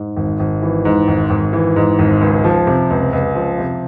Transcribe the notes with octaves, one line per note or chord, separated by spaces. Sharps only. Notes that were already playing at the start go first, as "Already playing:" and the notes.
Already playing: G#2
G#1
G#1
E3
G#2
G#1
G#1
E3
G#2
G#1
C#2
F3
C3
C#2
C#2
F3
C3